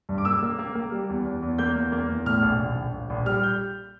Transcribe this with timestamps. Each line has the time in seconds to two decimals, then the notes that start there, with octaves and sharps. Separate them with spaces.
0.09 G2
0.18 D6
0.25 A#3 E6
0.43 A#3
0.59 A#3
0.75 A#3
0.92 G3
1.09 E2
1.25 E2
1.42 E2
1.58 A#3 G6
1.75 E2
1.92 A#3
2.09 E2
2.25 A2 F6
2.42 A#1
2.60 A#1
2.76 A#1
2.93 A#1
3.10 A#1
3.26 G3 F6
3.43 G6